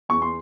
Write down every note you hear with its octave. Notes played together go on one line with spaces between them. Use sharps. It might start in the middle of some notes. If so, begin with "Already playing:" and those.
E2 C#6
C6